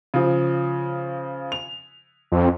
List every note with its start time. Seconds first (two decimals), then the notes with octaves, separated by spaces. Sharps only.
0.14 C#3 F3
1.52 F7
2.32 F2